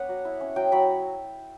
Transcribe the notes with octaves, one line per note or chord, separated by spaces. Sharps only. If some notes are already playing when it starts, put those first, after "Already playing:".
Already playing: B3 D4 B4 C#5 F#5
F#3
E4
C#4
F#3 G5
F#3 B5